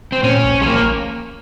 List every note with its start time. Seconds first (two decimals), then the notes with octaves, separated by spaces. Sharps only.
0.12 C4
0.23 A#2 C#4
0.44 A#1
0.61 G#3
0.66 A#1 A#3